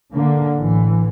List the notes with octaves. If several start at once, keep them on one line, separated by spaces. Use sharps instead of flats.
D3 A#3
A1 E3